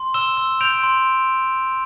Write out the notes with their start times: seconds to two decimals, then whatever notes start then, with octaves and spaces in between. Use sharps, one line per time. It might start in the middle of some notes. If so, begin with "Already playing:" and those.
Already playing: C6
0.14 E6 E7 G7
0.37 E6
0.61 G6 D7 F7
0.83 C6